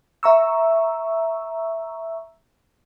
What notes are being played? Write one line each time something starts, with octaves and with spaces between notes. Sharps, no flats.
E5 A#5 C#6 E6